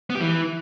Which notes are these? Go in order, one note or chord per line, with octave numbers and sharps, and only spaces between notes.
B3
G4
E3